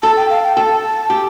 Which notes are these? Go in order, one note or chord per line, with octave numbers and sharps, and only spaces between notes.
A4 A5
G5
F5
G5
A4 A5
G4